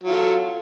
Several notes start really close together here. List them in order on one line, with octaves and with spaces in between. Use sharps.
F#3 F4 A4